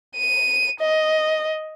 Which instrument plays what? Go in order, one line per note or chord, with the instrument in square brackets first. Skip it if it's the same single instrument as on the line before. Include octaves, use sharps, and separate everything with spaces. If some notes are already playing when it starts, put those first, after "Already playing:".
[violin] D#7
D#5